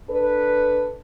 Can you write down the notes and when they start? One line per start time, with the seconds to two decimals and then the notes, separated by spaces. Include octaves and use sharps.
0.10 D4 A4 B4